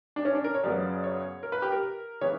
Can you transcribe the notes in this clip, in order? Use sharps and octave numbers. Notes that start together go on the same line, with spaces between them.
D4
C#4
D4
A#4
C#5
F#2 C#3 F#3 B3 D5
C#5
A#4
B4
G4
A#4
C#3 E3 B3 C#5